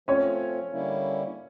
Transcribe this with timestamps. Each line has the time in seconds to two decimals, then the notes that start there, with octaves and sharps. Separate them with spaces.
0.08 F3 A3 C4 C#4 F4 C#5
0.72 D3 G3 A#3 C#4 E4